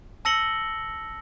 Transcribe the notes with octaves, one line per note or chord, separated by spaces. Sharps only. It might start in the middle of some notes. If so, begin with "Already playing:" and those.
A5 E6 A#6 C#7 F#7 G7